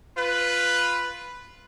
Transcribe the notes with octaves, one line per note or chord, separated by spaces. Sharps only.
F4 B4